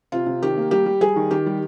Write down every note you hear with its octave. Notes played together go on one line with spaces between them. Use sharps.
C3 F4
C3
D#3 G4
A#3
G3 G4
G3
G3 G#4
D#3
D#3 G4
G3